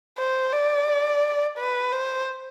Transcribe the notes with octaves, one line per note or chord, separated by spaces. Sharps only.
C5
D5
B4
C5